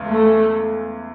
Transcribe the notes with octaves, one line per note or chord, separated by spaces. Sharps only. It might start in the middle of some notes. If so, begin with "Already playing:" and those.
Already playing: E2 C#3 G#3
A3